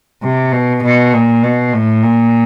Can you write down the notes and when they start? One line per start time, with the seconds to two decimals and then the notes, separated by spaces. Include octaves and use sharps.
0.23 C3
0.53 B2
0.83 B2
1.14 A#2
1.43 B2
1.74 A2
2.03 A#2